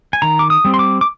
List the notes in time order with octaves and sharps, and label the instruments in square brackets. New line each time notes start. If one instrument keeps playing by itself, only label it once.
[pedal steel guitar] G#5
D#3 A#5
D6
D#6
G3 C4
C6
D6
D6